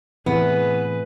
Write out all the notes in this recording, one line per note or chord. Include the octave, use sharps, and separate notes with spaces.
A2 C3 E3 B3 G#4 B4